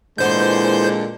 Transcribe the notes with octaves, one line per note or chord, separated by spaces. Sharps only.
A#2 D3 E3 G#3 B3 C5 G6